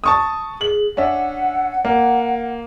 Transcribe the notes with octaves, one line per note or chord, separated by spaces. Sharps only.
A5 C#6 D#6
G#4 F#7
C#4 D4 E5 F#5
A#3 F#5